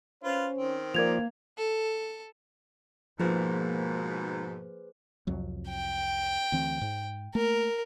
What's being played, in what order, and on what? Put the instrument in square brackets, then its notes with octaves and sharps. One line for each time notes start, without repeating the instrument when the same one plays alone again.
[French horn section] C#4 C5 [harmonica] F4 B4
[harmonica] D#3 C4
[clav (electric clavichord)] F3 D5 [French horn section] A#3 [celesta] A#4 G#6 F7
[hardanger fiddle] A4
[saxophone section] G#2 B2 [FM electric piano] F3 [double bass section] A#3 [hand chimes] G#4 B4 C5
[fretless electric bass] C2 F2 F#3
[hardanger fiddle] G5
[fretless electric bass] D2 E3 C4
G#2
[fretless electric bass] A3 A#3 [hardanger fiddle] A#4